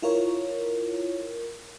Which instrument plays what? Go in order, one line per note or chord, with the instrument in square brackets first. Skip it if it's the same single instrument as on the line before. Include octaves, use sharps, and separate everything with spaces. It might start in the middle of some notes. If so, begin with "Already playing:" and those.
[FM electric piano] E4 F4 A#4 C#5